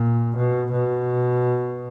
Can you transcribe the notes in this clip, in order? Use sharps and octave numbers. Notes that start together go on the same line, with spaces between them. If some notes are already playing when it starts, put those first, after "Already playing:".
Already playing: A#2
B2
B2